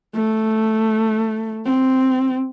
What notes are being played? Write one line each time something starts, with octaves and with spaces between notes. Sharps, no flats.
A3
C4